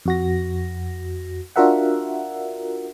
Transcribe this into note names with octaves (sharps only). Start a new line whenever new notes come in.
F2 F#4 A#6
D4 F4 F#4 A#4 E5 F#5